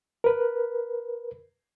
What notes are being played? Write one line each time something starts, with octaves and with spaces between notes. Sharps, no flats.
A#4 B4